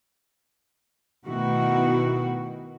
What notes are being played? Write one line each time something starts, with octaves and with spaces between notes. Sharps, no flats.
B2 D#3 A3 E4 F#4